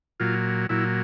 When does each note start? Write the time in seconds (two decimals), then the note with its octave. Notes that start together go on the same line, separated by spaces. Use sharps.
0.20 A#2 F#3 F4
0.69 A#2 F#3 E4